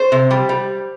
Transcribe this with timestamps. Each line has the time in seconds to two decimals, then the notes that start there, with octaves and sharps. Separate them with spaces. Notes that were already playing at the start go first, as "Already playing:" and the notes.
Already playing: C5
0.12 C3
0.31 G3
0.49 G3